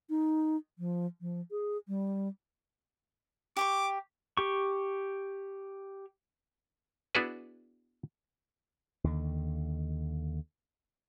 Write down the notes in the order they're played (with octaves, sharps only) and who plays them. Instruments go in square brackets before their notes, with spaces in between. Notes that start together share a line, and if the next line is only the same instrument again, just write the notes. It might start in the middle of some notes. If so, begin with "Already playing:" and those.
[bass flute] D#4
F3
F3
G#4
G3
[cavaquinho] G4 G5 C#6 [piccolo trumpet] D6
[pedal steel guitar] G4 C#6
[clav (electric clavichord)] B3 D4 E4 F#4 G#4 B4
[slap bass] D#2 D3